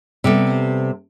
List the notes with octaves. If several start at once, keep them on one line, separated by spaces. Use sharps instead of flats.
C3 G3 B3 A4